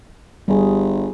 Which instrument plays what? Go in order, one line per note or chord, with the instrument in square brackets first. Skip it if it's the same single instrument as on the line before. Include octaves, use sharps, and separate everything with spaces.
[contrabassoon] G1 [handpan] G3 G#4